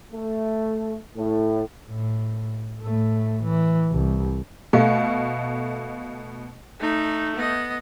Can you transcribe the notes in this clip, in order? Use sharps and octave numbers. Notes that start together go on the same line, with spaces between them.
A3
A2
A2
A2 A3
E3
C2
B2 A3 D#5 F5
A3 D#4
B3 D#5